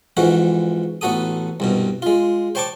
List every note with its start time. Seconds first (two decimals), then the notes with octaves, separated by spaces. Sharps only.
0.17 F2 G#2 E3 F#4
1.01 A1 B3 F#4 A4 D#6
1.60 C2 G2 B2
2.02 G#3 F4
2.55 C5 C#5 G5 A5 C#6 D6